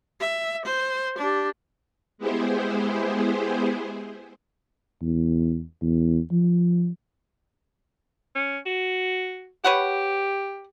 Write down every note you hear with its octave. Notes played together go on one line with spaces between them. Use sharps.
E5
C5
D4 G4
G#3 B3 E4 G4 G#4 C5
E2
E2
F3
C#4
F#4
G4 B4 C#5 F#5